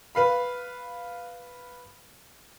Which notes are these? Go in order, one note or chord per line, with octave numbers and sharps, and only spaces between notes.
B4 F5 B5